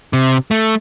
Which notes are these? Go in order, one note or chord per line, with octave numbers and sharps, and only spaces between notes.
C3
A3